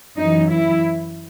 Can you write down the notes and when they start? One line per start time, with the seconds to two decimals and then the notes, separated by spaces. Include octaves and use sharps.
0.17 F#2 E3 D#4
0.52 E4